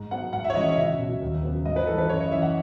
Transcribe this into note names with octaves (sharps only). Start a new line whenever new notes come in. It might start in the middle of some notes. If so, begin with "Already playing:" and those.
Already playing: G#2
F#3 B3 F#5
G#2 F#5
E5
C#5
E3 G#3 C#4 D#5
E5
C#2 E5
B2 F#3
D#2
C#3 F#3 B3
G#2 D#5
B4
E3 G#3 A4
B4
F#2 C#5
D#5
C#3 E3 E5
F#5